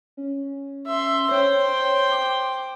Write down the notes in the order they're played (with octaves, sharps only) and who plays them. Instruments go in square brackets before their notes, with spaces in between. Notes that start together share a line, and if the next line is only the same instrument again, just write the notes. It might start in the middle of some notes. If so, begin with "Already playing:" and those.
[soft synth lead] C#4
[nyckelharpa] E5 C6
[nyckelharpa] C5 G5 [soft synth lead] C#5
[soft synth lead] D6